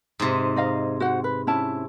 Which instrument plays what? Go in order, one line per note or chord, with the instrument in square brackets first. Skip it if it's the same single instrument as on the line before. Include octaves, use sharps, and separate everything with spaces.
[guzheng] G#2 C3
[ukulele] D#4 D#5 F5
F#4 C5 F#5
B4
C#4 E4 A5